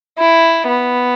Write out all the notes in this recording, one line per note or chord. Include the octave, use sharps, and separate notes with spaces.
E4
B3